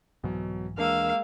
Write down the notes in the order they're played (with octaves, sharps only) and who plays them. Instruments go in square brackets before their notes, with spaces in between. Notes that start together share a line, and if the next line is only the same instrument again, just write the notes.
[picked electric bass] C2 G#2 E3 [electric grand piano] B2 F#3
[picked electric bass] D#2 E3 D4 [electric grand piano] G#3 A#4 [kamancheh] A#3 E6 [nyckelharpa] F5